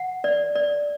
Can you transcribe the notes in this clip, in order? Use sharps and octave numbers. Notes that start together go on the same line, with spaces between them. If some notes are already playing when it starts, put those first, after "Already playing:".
Already playing: F#5
D5
D5